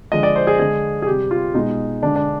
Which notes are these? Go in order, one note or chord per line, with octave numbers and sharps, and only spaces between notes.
D3 F3 G#3 D#5
D5
C5
G#4
D3 G#3 G#4
G#4
C3 G3 G4
F4
B2 G#3 D#4
D3 G#3 D4
D4